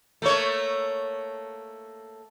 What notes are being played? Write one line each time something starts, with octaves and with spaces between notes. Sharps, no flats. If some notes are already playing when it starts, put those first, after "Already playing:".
A3 A#3 C#5